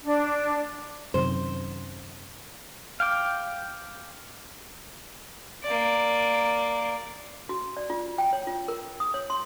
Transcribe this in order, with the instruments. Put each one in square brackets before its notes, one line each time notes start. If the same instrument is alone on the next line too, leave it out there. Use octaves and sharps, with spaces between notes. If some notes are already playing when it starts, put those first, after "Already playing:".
[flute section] D4
[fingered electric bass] F#2 C3 D#3 [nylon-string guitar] C5
[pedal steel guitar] F5 G5 D6
[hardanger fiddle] A#3 D5
[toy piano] F#4
D5
F4
G5
C#5
F4
A#4
D#6
C#5
C6